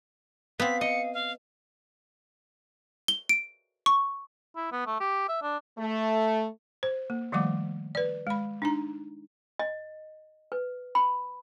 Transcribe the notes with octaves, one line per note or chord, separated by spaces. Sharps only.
B3 C4 F5 B6
D#5 C#7
F5
G7
D7
C#6
E4
B3
A3
G4
E5
D4
A3
C5
A#3
D#3 F3 G3 A3 F#5 D6
B4 D5
G#3 B5
D4 D#4 A#5
D#5
B4
B5